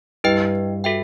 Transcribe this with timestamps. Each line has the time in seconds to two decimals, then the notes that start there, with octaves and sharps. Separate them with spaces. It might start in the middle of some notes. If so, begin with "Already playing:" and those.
0.24 G2 E4 B4 D#5 G5
0.84 F#4 A4 E5 G5